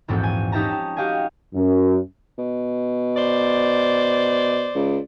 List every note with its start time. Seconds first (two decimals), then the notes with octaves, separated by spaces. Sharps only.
0.08 A#1 E2 G#2 C4 F#4 A4
0.23 G#5
0.52 C#4 D#4 G4 E5 A5 A#5
0.72 D#4
0.97 F#4 G4 D#5 F5 G#5
1.54 F#2
2.38 B2
3.17 C5 D5
4.75 C#2